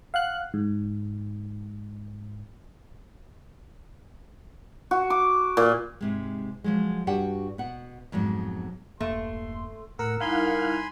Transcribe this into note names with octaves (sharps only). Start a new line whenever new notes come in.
F5 F#5 F#6
G#2
F#4
D6
A#2
G#2 C3 G#3
F3 F#3 G#3
G2 D4 F#4 G4 F#5 G5
B2 F#5
F2 G#2 B2 F#3
E1 G2 A3 A#3 C6
A2 A#4 F#5 E6
G3 D#4 E4 F5 F#5 G#5 B5 C6